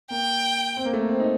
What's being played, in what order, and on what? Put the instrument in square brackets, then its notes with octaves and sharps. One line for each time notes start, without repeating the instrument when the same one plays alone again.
[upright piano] A#3 [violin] G5
[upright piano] C4
A#3
A3
A#3
C4
D#4